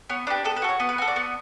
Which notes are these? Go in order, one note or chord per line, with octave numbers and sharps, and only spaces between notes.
B3 C#5
D4 G4 B4
B3 A4
B4
F#4 A4
C#5
B3
B4
F#4 A4
D5
B3